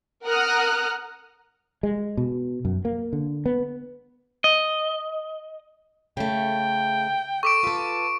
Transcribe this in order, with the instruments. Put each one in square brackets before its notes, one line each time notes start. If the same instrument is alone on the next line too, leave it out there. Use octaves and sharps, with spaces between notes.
[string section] A#4 F#5 A#5 D#6 F6 F#6
[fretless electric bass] G#3
B2
F#2
A#3
D3
B3
[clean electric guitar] D#5
[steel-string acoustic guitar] C#3 A3 [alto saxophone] G5
[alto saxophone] A4 [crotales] C#6 D6 D7
[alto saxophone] F4 [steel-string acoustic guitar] A4 B4